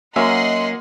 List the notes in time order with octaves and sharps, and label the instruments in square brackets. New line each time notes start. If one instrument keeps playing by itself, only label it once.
[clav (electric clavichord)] F#3 C#4 E5 [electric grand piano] A#3 A#4 [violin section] D#5 F#5 C6